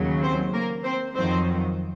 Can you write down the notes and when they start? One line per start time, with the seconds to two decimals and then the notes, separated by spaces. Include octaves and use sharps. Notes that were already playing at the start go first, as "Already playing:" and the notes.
Already playing: D#2 C#3 F#3
0.22 C4 C5
0.53 A#3 A#4
0.84 C4 C5
1.15 F2 D#3 F#3 C4 C5